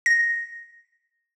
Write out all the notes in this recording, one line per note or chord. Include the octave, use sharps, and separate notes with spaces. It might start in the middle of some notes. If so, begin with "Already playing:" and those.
A#6